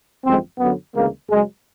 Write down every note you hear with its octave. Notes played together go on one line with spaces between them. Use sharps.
G#1 F#2 D3 F3 G#3 C4
F#2 D3 F#3 B3
D2 C#3 E3 G#3 A#3
F#2 C#3 F#3 G#3